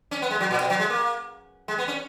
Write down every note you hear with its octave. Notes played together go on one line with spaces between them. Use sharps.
C#4
B3
G#3
F#3
A#2
B2
F#3
G#3
A#3
G#3
B3
C#4